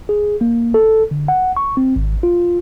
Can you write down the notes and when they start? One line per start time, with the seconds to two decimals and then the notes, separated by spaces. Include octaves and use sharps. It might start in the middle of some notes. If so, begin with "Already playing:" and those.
0.09 G#4
0.41 A#3
0.74 A4
1.11 D3
1.28 F#5
1.57 C#6
1.77 C4
1.96 G#1
2.23 F4